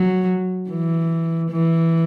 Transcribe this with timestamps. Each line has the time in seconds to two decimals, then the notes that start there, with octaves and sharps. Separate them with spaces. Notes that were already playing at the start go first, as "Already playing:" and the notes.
Already playing: F#3
0.70 E3
1.51 E3